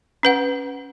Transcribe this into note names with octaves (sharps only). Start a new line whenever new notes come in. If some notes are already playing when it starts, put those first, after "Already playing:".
C#4 B4 F#5